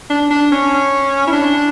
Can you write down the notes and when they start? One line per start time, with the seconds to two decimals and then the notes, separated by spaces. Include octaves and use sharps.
0.10 D4
0.31 D4
0.52 C#4
1.27 E4
1.33 D4